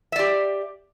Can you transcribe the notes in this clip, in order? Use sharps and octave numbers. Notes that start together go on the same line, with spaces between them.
G4 D5 E5